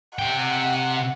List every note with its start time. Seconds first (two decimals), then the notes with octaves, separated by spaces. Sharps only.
0.19 C3 F#5 G5